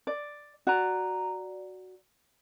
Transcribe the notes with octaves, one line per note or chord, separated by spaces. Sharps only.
D5
F#4 D5 A#5